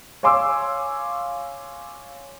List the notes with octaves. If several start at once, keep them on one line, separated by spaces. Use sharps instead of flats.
C#5 F5 G#5 C6 D6 E6